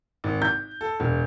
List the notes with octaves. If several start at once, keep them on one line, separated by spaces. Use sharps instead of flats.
G#1
G6
A4
E1